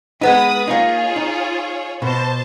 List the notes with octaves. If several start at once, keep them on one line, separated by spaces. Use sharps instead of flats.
G#3 B3 D#4 B4 D#6
A#3 D#4 F4 G#4 C#5
D#4
B2 C5 A5